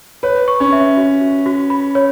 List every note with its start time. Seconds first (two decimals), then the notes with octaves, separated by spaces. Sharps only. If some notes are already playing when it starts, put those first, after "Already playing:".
0.23 B4 C#5
0.48 C#6
0.60 C#4
0.72 E5
0.97 F#4
1.21 F#4
1.46 F#4
1.70 B5
1.95 C#5